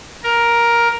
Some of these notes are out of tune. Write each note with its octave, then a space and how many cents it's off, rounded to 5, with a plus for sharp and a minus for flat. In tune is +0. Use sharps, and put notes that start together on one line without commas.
A#4 +10